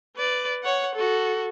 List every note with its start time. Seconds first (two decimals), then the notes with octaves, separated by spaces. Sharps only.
0.17 B4 D5
0.63 C#5 F#5
0.95 F#4 A4